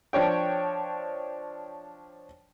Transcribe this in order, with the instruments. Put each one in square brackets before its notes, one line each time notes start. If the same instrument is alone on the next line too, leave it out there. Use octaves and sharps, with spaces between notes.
[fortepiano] F3 D4 C#5 G5